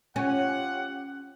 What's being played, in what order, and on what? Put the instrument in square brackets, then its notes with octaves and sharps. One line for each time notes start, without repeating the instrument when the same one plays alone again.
[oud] C#4 [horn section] F4 G4 F#5